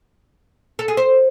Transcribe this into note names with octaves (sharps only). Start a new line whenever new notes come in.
A4
G#4
C5